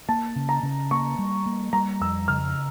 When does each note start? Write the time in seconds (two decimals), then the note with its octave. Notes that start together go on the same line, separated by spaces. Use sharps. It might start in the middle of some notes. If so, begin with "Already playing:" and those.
0.09 A#3 A5
0.36 C#3
0.49 A#5
0.63 C#3
0.91 A#3 C#6
1.19 G3
1.46 A#3
1.73 G3 A#5
2.00 F2 E6
2.28 C#3 F6